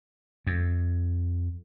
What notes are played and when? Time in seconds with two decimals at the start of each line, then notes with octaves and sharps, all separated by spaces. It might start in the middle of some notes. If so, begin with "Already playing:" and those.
0.47 F2